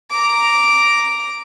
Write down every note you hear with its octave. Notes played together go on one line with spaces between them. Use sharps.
A#5 D6